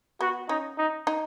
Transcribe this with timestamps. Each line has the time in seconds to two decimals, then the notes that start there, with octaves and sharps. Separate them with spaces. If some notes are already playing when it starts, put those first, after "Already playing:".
0.21 B3 F#4
0.49 C#4 D#4
0.78 D#4
1.07 D#4